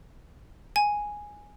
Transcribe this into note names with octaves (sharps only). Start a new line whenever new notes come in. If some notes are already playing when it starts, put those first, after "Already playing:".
G#5